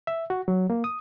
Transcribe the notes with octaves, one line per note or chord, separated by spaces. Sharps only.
E5
F#4
F#3
A#3
D#6